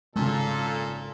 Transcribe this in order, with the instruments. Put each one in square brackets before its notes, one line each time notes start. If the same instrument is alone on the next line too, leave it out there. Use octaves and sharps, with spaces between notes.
[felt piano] G#1 C#3 [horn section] A#2 A4